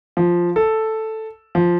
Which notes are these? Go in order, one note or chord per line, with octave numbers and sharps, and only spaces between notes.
F3
A4
F3